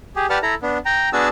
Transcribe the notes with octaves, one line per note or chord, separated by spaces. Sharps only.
G4 G#4
G4 B4 D5 F#5 A5 F6
E4 A4 A#5
B3 D4
G5 A#5
B3 D4 F#4 G#4 A5 E6